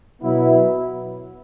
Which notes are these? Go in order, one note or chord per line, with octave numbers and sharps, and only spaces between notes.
B2 F#3 B3 E4